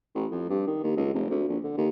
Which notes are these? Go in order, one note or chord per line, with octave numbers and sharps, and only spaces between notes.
A1
F2
G2
D#3
D#2
C#2
F1
D2
A#1
D3
D#2